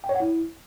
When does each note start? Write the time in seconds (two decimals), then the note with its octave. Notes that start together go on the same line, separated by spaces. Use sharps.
0.04 G5
0.09 C#5
0.15 F#5
0.20 E4